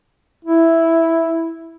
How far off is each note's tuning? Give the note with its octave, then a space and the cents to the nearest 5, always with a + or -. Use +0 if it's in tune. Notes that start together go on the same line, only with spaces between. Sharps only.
E4 +0